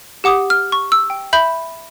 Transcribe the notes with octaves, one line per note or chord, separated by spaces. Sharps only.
G4 F#5 D6 D#6
F6
C#6
E6
G5
E5 B5 G6 F#7